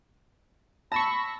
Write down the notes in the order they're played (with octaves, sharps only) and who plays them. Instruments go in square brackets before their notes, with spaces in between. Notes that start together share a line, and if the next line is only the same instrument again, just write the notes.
[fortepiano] A5 [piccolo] B5 [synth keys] C#6 E6 A#6